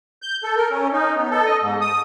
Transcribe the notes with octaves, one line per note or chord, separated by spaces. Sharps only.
G6
A4
A#4
C#4
D#4
B3
A4
D#5
G#2
D#6